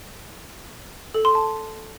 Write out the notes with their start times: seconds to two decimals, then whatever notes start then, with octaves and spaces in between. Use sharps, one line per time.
1.14 A4
1.25 C6
1.35 A5